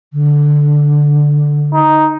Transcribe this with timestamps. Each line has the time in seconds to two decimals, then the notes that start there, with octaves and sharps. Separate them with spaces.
0.13 D3
1.73 D#4